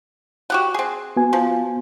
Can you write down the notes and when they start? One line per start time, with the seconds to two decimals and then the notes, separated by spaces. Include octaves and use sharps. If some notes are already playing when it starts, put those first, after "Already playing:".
0.50 F#4 G4 F#5
0.74 C4 G#4
1.17 B3 F#4 G#5
1.33 F3